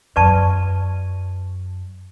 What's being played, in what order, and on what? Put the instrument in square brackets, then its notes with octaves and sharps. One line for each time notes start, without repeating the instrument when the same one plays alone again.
[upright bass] F#2 [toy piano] B4 D5 A5 C#6